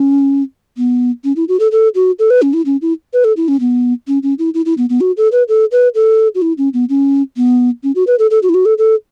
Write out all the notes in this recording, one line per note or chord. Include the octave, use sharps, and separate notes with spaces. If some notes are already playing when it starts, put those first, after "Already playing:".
Already playing: C#4
B3
C#4
E4
F#4
A4
A4
F#4
A4
B4
C#4
E4
C#4
E4
B4
A4
E4
C#4
B3
C#4
C#4
E4
E4
E4
B3
B3
F#4
A4
B4
A4
B4
A4
F#4
E4
C#4
B3
C#4
B3
C#4
F#4
B4
A4
A4
F#4
E4
F#4
A4
A4